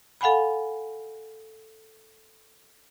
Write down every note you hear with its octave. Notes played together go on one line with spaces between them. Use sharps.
A4 F5 F#5 G#5 B5